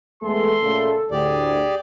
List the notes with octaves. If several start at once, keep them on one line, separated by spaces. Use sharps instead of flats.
E2 G#3 A3 A4 C6
A#2 C#3 A3
D2 A2 G4 G#4 D5